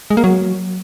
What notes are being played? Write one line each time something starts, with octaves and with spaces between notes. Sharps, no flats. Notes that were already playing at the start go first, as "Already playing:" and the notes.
G#3
A#3
F#3